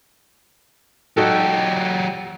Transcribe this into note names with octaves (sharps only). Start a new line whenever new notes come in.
F#3 D#4 F#4 G4 A4